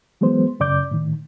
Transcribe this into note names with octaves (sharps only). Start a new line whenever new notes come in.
E3 F#3 G#3 B3 C5
F#2 C#3 D5 D6 G6
A2 D#3